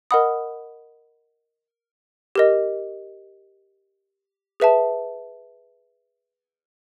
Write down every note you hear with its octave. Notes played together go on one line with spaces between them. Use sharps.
A#4 D#5 F#5 B5 D#6
G4 A#4 D#5
G#4 B4 E5 A5